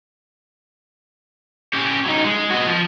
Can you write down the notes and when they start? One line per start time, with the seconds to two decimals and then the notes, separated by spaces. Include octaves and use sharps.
1.73 C#4 G4
2.06 F#3 D#4
2.25 G#3
2.50 F#4 D#5
2.66 F3